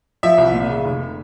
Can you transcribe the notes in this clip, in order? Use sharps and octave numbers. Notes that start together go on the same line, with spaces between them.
F3 E5
C2
A#2
C#3
F1